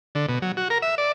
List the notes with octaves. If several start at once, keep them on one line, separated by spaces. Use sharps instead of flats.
D3
B2
F#3
F#4
A#4
E5
D5